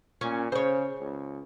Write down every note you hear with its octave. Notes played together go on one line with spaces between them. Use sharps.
A#2 C#4
C#3 C5 C#5
C#2